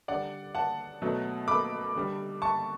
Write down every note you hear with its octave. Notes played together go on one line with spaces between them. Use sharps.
D3 G3 D5 F#5
F#5 A5
B2 F#3 A3
B5 D6
D3 G3
A5 C#6